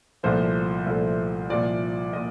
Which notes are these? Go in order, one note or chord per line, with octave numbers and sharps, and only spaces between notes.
C2 A#2 F3 A3 C5
C2 A#2 F3 A3
C2 A#2 F3 D5
A#2 D#5